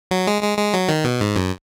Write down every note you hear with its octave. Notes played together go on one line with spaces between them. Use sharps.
F#3
G#3
G#3
G#3
F#3
D#3
B2
G#2
F#2